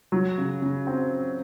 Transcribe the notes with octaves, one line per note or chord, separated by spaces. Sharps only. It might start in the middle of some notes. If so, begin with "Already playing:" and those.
F#3
C#3
C#3
C4